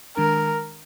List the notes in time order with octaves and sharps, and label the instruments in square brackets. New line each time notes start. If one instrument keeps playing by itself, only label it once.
[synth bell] D#3 G#3 D4 [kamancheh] A#4